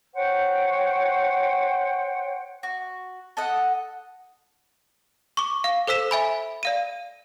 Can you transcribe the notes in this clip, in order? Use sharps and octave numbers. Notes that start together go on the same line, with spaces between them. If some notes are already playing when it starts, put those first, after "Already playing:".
C5 C#5 F#5 G5
F#4
A4 D#5 F#5
C#6 D6
F5
A4 C5 E6 B6 E7
E5 G#5 B5
D5 F5 D#7